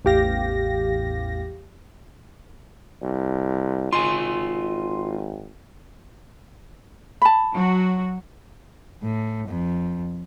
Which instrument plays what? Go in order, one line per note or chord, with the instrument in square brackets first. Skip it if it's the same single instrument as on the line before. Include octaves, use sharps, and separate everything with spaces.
[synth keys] A1 E2 G4 F5 A#6
[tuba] C2
[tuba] G#1 [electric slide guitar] F4 D#5 G#5 [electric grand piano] C6
[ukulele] A5 B5
[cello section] F#3 F#4
[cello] A2
F2